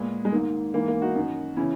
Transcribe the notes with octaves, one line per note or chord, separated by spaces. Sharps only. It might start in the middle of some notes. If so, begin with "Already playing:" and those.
Already playing: A#2 G#3 B3
G#3
G#2 D#3 A#3
G#2 E3 A#3
A#3
D#4 F#4
F#2 D#3
C#3 E3 C#4 E4